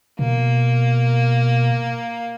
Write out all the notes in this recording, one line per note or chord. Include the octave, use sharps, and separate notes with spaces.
B2 A#3